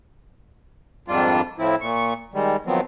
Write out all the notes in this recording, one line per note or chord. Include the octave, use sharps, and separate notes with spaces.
F2 G#2 D#3 G3 D4 F4
A2 F3 C4 E4
A#2 C#6
D#3 G3 G#3
D#3 F3 F#3 B3 C4